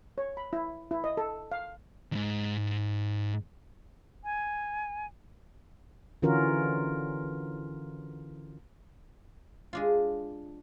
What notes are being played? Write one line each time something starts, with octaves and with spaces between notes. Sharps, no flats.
C#5
B5
E4
E4
D#5
A4
F5
E2 G#2
G#5
D3 E3 C#4 F4 F#4 A#4
G#3 D4 F4